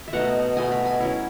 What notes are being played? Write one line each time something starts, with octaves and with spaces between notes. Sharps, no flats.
E5
B2 A3 D#4 F#5
B2 A3 D#4 G#5
B5
G#5
F#3 C#4 E4